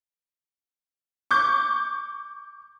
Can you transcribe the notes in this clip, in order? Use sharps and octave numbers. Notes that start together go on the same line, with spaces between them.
C#6 D6 G6